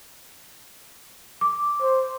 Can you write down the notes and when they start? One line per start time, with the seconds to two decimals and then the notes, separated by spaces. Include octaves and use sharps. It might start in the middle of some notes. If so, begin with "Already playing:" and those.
1.41 D6
1.82 C5